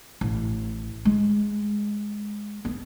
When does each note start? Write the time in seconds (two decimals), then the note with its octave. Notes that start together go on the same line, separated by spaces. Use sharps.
0.21 A1
1.05 G#3
2.65 B3